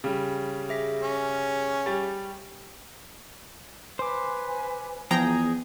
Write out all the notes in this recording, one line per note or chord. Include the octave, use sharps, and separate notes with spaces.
C#3 G3
G#4 E5 B6
C#4
G3 G4 A6
B4 C5 G#5 D6
E2 F3 G#4 G5 A#5